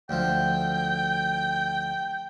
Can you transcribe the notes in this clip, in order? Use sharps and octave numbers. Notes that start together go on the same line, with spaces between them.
D2 F3 G5